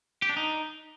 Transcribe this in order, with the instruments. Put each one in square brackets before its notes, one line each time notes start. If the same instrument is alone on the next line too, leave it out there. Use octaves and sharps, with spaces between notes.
[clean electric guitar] G4
D4
D#4